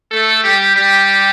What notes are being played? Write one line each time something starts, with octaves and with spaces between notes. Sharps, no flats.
A3 A4
G3 G4
G3 G4